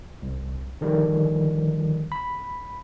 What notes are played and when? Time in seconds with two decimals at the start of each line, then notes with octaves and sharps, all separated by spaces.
0.22 C2
0.81 D3 D#3 F3 G3
2.12 B5